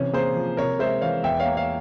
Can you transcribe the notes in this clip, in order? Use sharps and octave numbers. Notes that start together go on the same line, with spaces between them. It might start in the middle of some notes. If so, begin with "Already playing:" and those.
Already playing: C3 E3 C#4
A#3 G#4 C5
F3
C3 A#4 C#5
G#3 C5 E5
E3 C#5 F5
E2 E5 G5
C#5 F5
A#3
C#5 F5